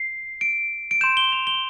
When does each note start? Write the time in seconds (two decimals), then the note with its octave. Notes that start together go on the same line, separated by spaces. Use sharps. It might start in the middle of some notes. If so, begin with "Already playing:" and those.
Already playing: C7
0.41 D7
0.91 D7
1.01 C6 G6 E7
1.17 G7
1.33 F7
1.47 G7